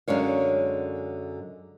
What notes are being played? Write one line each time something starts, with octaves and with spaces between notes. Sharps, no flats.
F#2 D3 G#3 C#5 F5